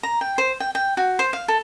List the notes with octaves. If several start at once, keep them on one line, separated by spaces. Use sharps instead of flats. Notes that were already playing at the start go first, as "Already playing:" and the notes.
A#5
G5
C5
G5
G5
F#4
C5
F5
A4